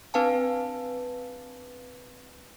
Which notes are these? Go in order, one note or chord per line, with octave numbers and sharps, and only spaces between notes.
C4 D4 B4 F5 G#5 A5